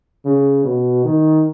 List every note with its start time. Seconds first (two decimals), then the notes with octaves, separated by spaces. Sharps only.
0.25 C#3
0.65 B2
1.05 D#3